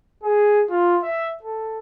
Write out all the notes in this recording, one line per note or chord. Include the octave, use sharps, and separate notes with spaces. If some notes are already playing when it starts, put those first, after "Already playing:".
G#4
F4
E5
A4